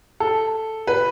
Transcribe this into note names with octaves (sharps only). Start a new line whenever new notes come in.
A4
B4